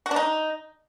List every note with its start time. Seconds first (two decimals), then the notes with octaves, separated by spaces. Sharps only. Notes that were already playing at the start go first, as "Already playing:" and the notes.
0.06 F#4
0.11 D4
0.16 D#4